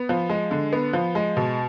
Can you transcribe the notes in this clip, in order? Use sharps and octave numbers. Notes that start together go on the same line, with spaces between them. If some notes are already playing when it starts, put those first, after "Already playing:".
Already playing: B3
F3
G#3
D3
B3
F3
G#3
B2